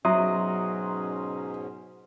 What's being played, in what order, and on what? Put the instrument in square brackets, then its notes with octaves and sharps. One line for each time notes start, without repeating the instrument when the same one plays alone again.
[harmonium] G#2 B2 C#4 [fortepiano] F#3 [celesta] E5 [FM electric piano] A#5 C6 D#6